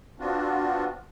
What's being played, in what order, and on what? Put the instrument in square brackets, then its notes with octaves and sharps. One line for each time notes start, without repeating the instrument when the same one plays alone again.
[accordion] B3 C4 D4 F4 F#4